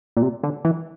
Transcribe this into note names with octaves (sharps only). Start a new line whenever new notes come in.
A#2
C3
D3
E3